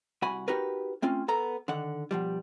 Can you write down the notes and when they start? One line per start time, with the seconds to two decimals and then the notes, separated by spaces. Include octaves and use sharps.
0.22 C2 F#4 F#5 G#5 B5
0.48 D#4 F#4 G4 A#4 B4
1.02 A3 C4 C#4 F4
1.28 B3 A4 A#5
1.68 D3 D#3 F#5
2.11 B2 F3 G3